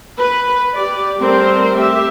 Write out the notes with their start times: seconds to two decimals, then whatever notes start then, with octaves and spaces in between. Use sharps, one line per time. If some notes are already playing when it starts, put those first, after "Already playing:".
0.18 B4
0.73 G4 D5
1.18 G3 A3 C4 A#4 C5
1.76 G4 E5